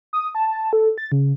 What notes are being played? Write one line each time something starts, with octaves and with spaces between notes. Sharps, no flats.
D#6
A5
A4
A6
C#3